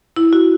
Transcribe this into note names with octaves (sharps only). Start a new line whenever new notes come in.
E4
F#4